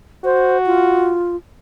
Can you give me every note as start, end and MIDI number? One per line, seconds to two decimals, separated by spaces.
0.24 1.15 66
0.24 0.58 72
0.66 1.36 65